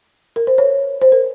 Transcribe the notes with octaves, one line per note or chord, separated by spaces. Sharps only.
A#4
C5
C#5
C5
A#4